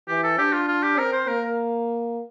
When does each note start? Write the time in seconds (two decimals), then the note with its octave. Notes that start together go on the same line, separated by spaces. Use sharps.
0.08 E3 G4
0.23 A4
0.38 D4 G4
0.53 F4
0.68 F4
0.83 G4
0.98 C4 A#4
1.13 C5
1.27 A#3 A#4